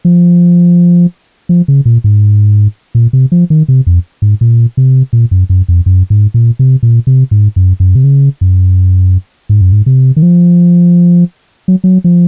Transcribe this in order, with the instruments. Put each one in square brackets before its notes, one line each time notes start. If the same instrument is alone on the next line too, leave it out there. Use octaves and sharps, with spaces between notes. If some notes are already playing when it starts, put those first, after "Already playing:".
[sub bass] F3
F3
C#3
A#2
G#2
A#2
C3
F3
D#3
C3
F2
G#2
A#2
C3
A#2
F#2
F#2
F2
F#2
G#2
A#2
C3
A#2
C3
G#2
F#2
F#2
C3
C#3
F#2
G#2
F#2
G#2
C3
D#3
F3
F#3
F#3
F3